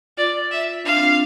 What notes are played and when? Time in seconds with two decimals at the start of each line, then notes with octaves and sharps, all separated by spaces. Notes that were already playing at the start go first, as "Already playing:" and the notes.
0.17 F4 D5
0.51 E5
0.84 D4 F5
0.96 C4
1.01 D4